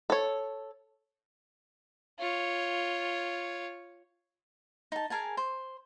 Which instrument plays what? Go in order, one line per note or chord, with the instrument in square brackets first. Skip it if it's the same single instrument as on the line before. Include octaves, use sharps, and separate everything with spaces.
[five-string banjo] A4 C#5
[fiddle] F4 C#5
[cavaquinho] D#4 A5
G#4 A#4 G#5 A5
C5